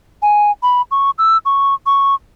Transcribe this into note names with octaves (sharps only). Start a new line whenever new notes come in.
G#5
B5
C#6
E6
C#6
C#6